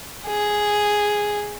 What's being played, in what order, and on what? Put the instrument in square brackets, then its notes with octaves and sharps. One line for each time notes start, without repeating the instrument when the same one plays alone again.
[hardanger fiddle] G#4